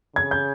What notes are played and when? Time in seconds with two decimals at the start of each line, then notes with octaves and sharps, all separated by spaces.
0.16 C#3 G#6
0.31 G6